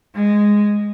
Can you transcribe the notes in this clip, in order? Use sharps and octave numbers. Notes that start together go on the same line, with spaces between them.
G#3